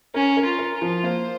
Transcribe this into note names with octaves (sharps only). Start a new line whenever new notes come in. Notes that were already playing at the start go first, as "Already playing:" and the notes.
C#4 A#4
A#4
F4
A#4
F4
F3
A#3 C5